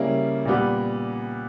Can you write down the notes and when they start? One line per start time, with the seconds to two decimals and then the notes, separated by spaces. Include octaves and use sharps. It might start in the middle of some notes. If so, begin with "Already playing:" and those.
Already playing: C#3 G3 A#3 C#4 E4
0.45 A#2 G3 B3